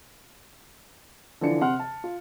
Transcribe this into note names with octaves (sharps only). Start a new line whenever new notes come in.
D3 E3 F3 D4 C#7
C3 F#5 C6 F6
A5
F4